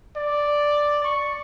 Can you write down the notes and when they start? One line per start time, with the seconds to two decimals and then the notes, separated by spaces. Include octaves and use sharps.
0.16 D5
1.04 C#6